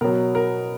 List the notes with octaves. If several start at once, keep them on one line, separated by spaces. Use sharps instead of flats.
B2 F#3 A#4
A#4